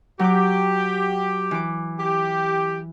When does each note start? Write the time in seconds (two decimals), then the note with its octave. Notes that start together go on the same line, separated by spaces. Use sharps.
0.19 F#3 G4 D6
1.51 E3 D6
1.99 G4